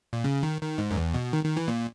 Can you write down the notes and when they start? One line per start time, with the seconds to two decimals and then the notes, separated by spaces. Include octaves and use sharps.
0.13 A#2
0.24 C#3
0.43 D#3
0.61 D#3
0.78 G#2
0.91 F#2
0.97 E2
1.14 B2
1.33 D#3
1.45 D#3
1.57 E3
1.68 A#2